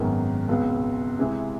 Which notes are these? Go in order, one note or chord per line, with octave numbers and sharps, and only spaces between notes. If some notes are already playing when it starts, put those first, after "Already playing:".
Already playing: G#1 F#2 D#3 G#3 B3
C#2 B2 G#3 C4
C3 E3 G#3